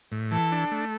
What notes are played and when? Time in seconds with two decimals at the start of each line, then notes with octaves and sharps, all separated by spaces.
0.12 A2
0.32 E3 A4
0.52 D4
0.71 A3